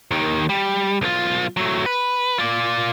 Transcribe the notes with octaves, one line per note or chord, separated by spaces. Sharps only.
D#2 D#3
G3
B1 F4
F#3 A3
B4
F4 D5